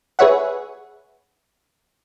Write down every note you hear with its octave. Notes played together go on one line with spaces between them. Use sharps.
G#4 B4 C#5 E5 F#5